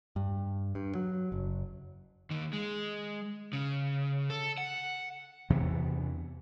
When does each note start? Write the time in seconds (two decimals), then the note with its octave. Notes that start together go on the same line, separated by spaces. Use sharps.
0.16 G2
0.75 G2
0.95 F#3
1.32 F#1
2.30 D#2 D#3
2.53 G#3
3.53 C#3
4.30 A4
4.58 F#5
5.50 E2 C3 E3 B3